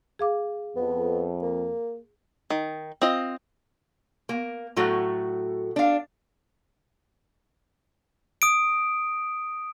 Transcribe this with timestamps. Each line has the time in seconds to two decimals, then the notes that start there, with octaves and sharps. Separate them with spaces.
0.19 G#4 F5 D6
0.76 F2 B3
1.42 A#3
2.50 D#3
3.02 C4 F4 D#5
4.29 A#3
4.77 A2 F#3 A3 F#4
5.76 D4 F5
8.42 D#6 D7